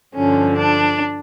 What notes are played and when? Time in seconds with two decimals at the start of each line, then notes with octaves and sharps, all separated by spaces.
0.15 G2 D3 F3 C#4
0.57 D4